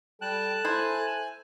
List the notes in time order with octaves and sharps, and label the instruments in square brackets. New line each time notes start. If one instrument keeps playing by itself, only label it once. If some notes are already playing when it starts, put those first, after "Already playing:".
[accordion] G3 G5 [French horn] A4 [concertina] A5 F#6
[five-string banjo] E4 C5 [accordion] G#5